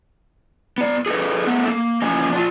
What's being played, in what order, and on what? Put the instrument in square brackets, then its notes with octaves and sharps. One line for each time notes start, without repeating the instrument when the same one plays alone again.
[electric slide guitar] B3 D5
G#4 A4 B4 D#5
A3 B3
A#3
E2 F3 A#3 C#4 D#5 G#5
D4 F4